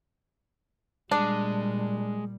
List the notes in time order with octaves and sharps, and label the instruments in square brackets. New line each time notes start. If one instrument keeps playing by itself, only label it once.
[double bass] A#2 G3 [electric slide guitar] G#3 [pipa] D4